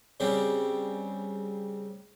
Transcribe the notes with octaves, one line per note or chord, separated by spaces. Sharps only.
C#3 G3 C4 C#4 D5